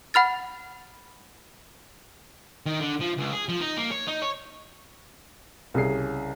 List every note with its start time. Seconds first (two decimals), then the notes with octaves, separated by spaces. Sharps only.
0.14 F#5 B5 F6 A6
2.66 D#3
2.80 D3
3.00 F3
3.17 C#2
3.33 G#4
3.49 F3
3.60 D#4
3.77 A#3
3.91 C#5
4.07 D#4
4.22 C#5
5.74 C2 C#3 G#4 C7